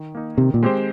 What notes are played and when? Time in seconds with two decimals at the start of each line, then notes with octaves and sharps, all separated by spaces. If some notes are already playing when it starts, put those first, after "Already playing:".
Already playing: D#3
0.15 A#3 D#4
0.38 C3 D#3
0.54 A#2
0.63 G#3 C4 G4 C5